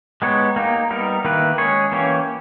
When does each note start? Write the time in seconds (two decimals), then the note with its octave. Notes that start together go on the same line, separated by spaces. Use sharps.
0.22 G#3 B3 D#4 G4 C#5
0.56 A#3 D#4 G4
0.90 G3 B3 D#4 A#4
1.25 D#3 A#3 E4 G4 B4
1.58 G#3 C#4 G#4 C#5
1.92 E3 A#3 C#4 G4 C#5